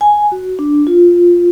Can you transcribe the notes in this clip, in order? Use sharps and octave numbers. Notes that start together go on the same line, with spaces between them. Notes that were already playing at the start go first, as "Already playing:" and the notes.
G#5
F#4
D4
F4